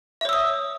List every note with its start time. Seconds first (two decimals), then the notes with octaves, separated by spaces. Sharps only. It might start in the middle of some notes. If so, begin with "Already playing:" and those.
0.21 E5
0.25 C#5
0.29 E6
0.33 D#6